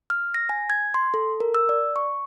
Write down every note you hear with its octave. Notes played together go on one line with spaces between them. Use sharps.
F6
A#6
G#5
G#6
C6
A4
A#4
E6
D5
C#6